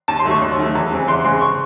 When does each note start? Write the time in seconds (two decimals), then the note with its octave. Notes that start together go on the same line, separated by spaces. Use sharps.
0.08 D#2 A5
0.20 C6
0.25 D#3 F#3 A3
0.31 C#6
0.42 D#2
0.58 D#3 F#3 A3
0.75 E2
0.91 C#3 G#3 C4
1.08 E2 C6
1.25 C#3 G#3 C4 C6
1.41 C#6